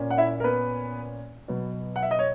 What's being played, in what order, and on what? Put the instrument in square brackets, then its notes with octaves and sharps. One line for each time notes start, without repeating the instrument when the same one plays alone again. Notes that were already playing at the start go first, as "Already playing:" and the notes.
Already playing: [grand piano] A#2 A#3 C#4
F#5
E4 E5
A#4
B3 B4
B2 F#3 B3
F#5
E5
D#5
C#5